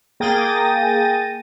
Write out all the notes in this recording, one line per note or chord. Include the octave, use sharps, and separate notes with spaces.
A#3 G#4 G5 A6 A#6 D#7